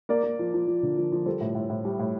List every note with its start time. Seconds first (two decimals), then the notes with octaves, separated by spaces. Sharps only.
0.09 A#3 A#4 D5
0.23 A#3
0.39 F3
0.54 F3
0.67 F3
0.83 D3
0.97 F3
1.12 F3
1.26 G3 A4 C5
1.41 A2
1.55 A2
1.70 A2
1.85 G3
1.99 A2